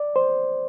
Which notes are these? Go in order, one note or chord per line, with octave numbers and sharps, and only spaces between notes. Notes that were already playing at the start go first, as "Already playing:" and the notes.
Already playing: D5
C5